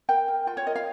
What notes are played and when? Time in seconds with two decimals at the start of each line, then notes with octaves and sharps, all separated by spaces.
0.09 A#4 G5
0.28 A#4
0.47 F4 G5
0.57 C#5
0.66 A#4 D#5
0.76 F5